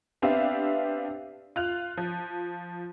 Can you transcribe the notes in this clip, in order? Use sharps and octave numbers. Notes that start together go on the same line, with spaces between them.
B3 C4 D4 G4 E5 F5
F4 F#6 F7
F3